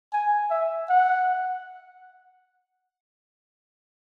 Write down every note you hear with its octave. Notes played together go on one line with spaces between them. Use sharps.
G#5
E5
F#5